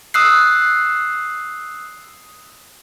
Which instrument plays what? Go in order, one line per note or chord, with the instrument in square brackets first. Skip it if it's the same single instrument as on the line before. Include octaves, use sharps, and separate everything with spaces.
[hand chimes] D#6 E6 F#6 C7